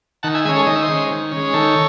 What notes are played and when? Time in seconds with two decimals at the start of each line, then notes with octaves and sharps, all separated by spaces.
0.23 D#3 F#5 A5
0.34 E5 G#5
0.45 G#3 E5 G#5
0.48 C#4
0.56 A4 C#5
0.67 D#3 D#5
0.75 E5
0.82 C5 D#5
0.88 G#3 C#4
1.10 D#3
1.32 G#3 C#4
1.53 D#3 A4 C#5